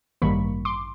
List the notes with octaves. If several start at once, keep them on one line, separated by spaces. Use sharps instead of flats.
A1 G2 D#3 G3 A#3 B5 C#6
C6 D6